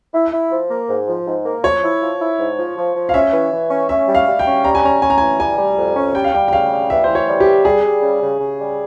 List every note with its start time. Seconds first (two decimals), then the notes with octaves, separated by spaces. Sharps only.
0.14 E4
0.32 E4
0.51 F3
0.69 A#3
0.89 G#2
1.07 F3
1.27 G#2
1.45 A#3
1.64 F3 C#5
1.83 E4
2.01 F3
2.20 E4
2.39 G#2
2.58 F3
2.77 F3
2.95 F3
3.09 F5
3.14 C#4 E5
3.33 E3
3.52 E3
3.70 C#4
3.89 C#4 E5
4.08 G3
4.15 F5
4.27 G3
4.39 G5
4.45 C#4
4.64 G3 A#5
4.75 G#5
4.83 C#4 A#5
5.02 C#4 G#5
5.10 A#5
5.18 E3 G#5
5.40 G3 G#5
5.58 G3
5.78 F2
5.96 C#4
6.15 G3 G5
6.24 F5
6.34 G3 G5
6.48 G5
6.53 C#3 F5
6.71 G3
6.90 E3 E5
7.04 E3 C5
7.15 C#5
7.27 G3
7.40 G4
7.47 G3
7.65 G3 G#4
7.84 G3
8.02 C#3
8.21 C#3
8.40 C#3
8.59 G3